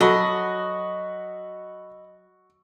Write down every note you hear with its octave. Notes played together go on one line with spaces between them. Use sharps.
F#3 F#4 A4 D#5 B5